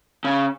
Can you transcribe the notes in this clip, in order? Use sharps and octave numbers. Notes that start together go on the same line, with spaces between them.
C#3